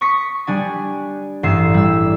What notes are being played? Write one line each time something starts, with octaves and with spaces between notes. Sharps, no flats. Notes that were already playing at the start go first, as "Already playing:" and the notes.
C#6 D#6 B6 C#7
G3 D4 G#5
A1 G2 G#4 E6 C7 E7
G3 E6